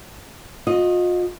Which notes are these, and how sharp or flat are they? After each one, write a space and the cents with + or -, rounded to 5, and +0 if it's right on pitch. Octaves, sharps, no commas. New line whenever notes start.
F4 +40 D#5 +0